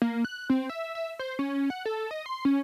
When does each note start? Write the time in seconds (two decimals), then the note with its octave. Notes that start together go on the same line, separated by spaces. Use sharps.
0.02 A#3
0.25 F#6
0.50 C4
0.70 E5
0.95 E5
1.19 C5
1.39 C#4
1.70 F#5
1.86 A4
2.11 D#5
2.26 C6
2.45 C#4